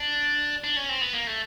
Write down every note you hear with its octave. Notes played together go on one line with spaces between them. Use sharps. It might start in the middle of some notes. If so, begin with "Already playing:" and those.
Already playing: D4
D4
C#4
C4
B3
A#3
A3